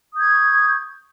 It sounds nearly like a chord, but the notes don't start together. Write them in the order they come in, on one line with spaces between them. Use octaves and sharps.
D#6 G6 G#6 C#6